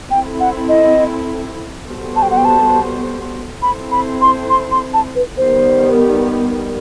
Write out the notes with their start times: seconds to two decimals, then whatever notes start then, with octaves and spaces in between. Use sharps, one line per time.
0.10 C4 E4 A4 G5
0.40 F#5
0.68 D#5
1.86 G3 B3 F#4 A4 C5
2.16 A5
2.22 G5
2.31 F#5
2.37 G5
2.45 A5
3.62 C4 E4 A4 C5 B5
3.91 B5
4.21 C6
4.50 C6
4.71 C6
4.93 A5
5.15 B4
5.37 D#3 G3 B3 C5